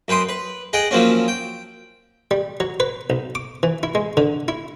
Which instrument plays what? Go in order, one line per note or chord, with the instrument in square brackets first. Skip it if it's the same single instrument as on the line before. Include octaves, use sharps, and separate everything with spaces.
[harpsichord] F#2 B4 G5 C6 D#6
B4
G#4 D#5 F#5 G5
F3 F#3 A#3 C4 C#4
G5
G3
F#3
B4
B1
D6
E3
E4
G#3
D3
E4